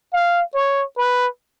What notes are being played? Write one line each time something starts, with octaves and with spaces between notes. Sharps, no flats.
F5
C#5
B4